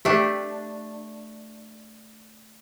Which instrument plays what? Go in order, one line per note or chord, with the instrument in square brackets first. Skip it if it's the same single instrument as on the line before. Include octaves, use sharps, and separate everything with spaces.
[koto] A3 D4 [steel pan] G4 E5